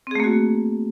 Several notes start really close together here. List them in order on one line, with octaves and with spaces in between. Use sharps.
C4 G#4 A3 A#3 F#4